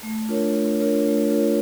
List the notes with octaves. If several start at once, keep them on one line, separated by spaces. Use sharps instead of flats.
A3
D4 F4 A#4 C#5
A3
D4 F4 A#4 C#5
A3
D4 F4 A#4 C#5